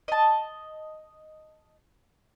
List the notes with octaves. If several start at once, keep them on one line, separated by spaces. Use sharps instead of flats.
D#5 A5